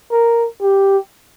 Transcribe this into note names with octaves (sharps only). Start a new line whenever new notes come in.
A#4
G4